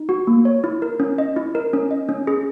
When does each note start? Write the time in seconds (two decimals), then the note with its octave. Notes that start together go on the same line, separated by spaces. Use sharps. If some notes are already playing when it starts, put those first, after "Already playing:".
Already playing: D#4
0.09 F#4
0.27 A#3
0.45 C#5
0.64 E4
0.82 A#4
1.00 C#4
1.18 D#5
1.36 E4
1.55 A#4
1.73 C#4
1.91 D#5
2.09 C#4
2.27 G#4